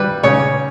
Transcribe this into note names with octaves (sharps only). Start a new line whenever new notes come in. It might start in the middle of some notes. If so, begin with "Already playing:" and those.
Already playing: G3 B4
C#3 C#5